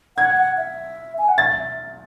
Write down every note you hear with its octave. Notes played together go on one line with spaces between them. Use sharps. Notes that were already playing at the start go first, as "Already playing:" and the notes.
F#5 G#6
F#5
E5
G#5
F#5
E5 A6
E5